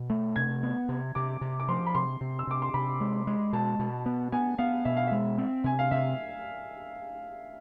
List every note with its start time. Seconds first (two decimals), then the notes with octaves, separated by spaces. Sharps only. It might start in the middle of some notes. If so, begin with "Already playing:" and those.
Already playing: B2
0.10 A3
0.36 C3 G#6
0.63 B3
0.89 C3
1.15 C3 D6
1.41 C3
1.60 D6
1.68 F3 C6
1.87 B5
1.95 C3 C6
2.21 C3
2.39 E6
2.47 C3 D6
2.62 C6
2.74 C3 B5
3.01 G#3
3.27 G#3
3.53 B2 A5
3.79 B2
4.06 B3
4.32 B3 G#5
4.58 B3 F5
4.85 B2 E5
4.97 F5
5.07 G#3 E5
5.38 C4
5.64 C3 G#5
5.79 F5
5.91 C3 E5